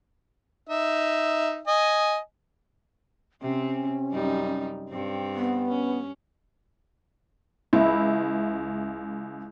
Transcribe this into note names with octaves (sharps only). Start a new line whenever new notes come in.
D#4 E5
D#5 G#5
C3 C4 C#4
F#2 G3 D#4
G2 C4
B3
C#4
C#2 E4